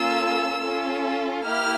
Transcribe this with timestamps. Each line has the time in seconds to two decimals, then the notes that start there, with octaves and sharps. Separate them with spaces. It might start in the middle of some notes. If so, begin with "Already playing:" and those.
Already playing: A#3 C#4 F4 A4 E6
0.60 C#4 F4 A4
1.44 A#3 E4 G4 F6